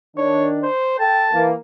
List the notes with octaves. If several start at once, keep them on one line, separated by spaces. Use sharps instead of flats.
D#3 D4 C#5
C5
A4 G5 A5
E3 A#3